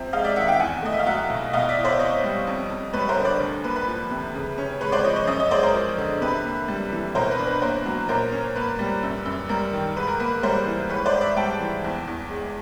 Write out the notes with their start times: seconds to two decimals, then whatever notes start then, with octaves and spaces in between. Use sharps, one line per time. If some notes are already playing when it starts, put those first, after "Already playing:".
Already playing: C3 F3 C4
0.13 G#3 D#5 F5
0.24 D5 E5
0.36 D#3 E5 F#5
0.48 F5 G5
0.59 E2 F#5 G#5
0.83 A3 D#5
0.92 E5
0.99 F5
1.06 F#3 E5 F#5
1.30 B2
1.53 B2 D#5 F5
1.69 D5 E5
1.77 E4
1.84 C5 D5
1.99 C4 C#5 D#5
2.23 G3
2.47 F2
2.70 F2
2.93 G3 B4 C#5
3.09 A#4 C5
3.17 D3
3.24 C5 D5
3.40 D2
3.64 A#3 B4
3.76 B4
3.88 F3
4.11 C3
4.34 C#3
4.58 C#4
4.81 G#3 B4 C#5
4.92 C5 D5
5.04 F3 C#5 D#5
5.16 C#5 D#5
5.27 F#2 C#5 D#5
5.40 C#5 D#5
5.51 G#3 C5 D5
5.63 A#4 C5
5.75 F3
5.98 D3
6.21 C3 B4
6.45 A#3
6.68 G3
6.92 E3
7.15 B2 A#4 C5
7.31 B4
7.39 D4
7.47 B4
7.62 A#3 A#4 C5
7.86 F#3
8.08 A#2 A#4 C5
8.32 C#4
8.56 A#3 B4
8.79 G3
9.03 F#2
9.26 F#2
9.49 G3 A#4
9.73 D#3
9.96 G#2 B4
10.07 A#4
10.20 A#3 B4
10.43 G3 A#4 C5
10.66 E3
10.89 G#2 B4 C#5
11.06 C5 D5
11.13 G#2
11.21 D5 E5
11.36 G3 G5 A5
11.60 E3
11.84 E2
12.07 E2
12.31 G#3